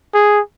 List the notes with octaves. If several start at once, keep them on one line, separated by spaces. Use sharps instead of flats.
G#4